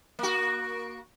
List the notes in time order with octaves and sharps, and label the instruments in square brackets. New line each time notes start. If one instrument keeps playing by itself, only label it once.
[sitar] A#3 F#4